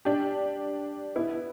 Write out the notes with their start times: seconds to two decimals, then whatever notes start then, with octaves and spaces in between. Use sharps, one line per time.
0.05 D4 G4
1.16 B3 E4